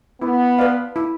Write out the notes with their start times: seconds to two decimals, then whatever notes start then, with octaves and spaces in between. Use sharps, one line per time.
0.21 B3 E4
0.59 B4 D5 F5
0.96 E4